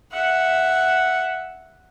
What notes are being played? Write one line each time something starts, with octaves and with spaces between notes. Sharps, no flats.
E5 F#5